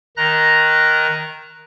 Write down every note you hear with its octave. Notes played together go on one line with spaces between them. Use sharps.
D#3 D#5 A#5 F#6 A#6